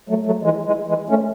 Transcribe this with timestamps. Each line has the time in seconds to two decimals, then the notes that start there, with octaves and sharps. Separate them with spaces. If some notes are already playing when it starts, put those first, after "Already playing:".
0.09 F#3 A3
0.26 F#3 A3
0.43 E3 G#3
0.65 E3 G#3
0.87 E3 G#3
1.09 A3 C#4